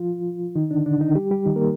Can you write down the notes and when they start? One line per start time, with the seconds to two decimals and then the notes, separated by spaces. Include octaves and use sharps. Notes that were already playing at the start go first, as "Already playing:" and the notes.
Already playing: F3 F4
0.56 D#3 D#4
0.71 D3 D4
0.86 D3 D4
1.01 D#3 D#4
1.15 G3 G4
1.31 G3 G4
1.46 D#3 D#4
1.56 A#3 A#4